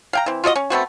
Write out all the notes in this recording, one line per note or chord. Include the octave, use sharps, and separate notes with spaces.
F5 G5 A#5
E3 C4
F4 F#4 D5 D#5
C#4
A3 B3 C4 F#4